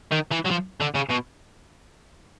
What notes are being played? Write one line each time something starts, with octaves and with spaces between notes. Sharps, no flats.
D#3
E3
F#3
F3
D3
C#3
B2